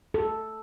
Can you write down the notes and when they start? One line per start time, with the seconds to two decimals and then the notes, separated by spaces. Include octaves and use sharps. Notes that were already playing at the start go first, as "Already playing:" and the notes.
0.14 A4